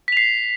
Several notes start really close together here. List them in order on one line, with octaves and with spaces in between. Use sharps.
B6 F7 C7